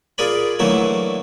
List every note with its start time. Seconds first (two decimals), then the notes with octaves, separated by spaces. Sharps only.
0.18 F4 G#4 A#4 D5 G#5 B5
0.59 D3 E3 F#3 A3 A#3 E4